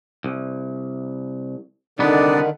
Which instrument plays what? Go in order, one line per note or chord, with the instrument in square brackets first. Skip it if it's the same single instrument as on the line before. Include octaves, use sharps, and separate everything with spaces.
[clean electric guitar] C2
[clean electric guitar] C2 B3 [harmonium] D3 D#3 [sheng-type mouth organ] D4 D#4 D5